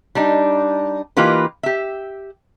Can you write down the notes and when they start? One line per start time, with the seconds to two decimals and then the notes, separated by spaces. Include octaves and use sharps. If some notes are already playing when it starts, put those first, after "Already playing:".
0.15 G3 D4 D#4
1.17 E3 A#3 D#4 F4 G4 B4
1.63 G4 E5